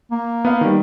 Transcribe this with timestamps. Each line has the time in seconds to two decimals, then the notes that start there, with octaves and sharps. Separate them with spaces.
0.11 A#3
0.45 B3 F5
0.61 D#3 G3